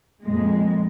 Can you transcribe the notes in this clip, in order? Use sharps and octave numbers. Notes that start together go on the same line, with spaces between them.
F2 A#2 G#3